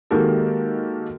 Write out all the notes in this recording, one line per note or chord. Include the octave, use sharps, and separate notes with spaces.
D#3 G#3 A#3 F#4 G4 A4